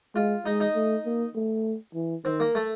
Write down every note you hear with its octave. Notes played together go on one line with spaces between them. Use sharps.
G#3 F4
G#3 D#4
D#4
A3
A#3
A3
E3
D#3 C4
A#3
A3